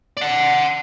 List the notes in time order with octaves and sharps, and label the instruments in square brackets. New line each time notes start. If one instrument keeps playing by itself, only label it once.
[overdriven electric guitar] D5 F#5